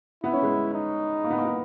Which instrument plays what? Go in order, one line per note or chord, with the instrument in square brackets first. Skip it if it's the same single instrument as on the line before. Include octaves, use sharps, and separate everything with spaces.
[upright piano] B3 [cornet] E4
[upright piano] C#4
G#3 B3
[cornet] D#4
[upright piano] A#3
B3
A#3
B3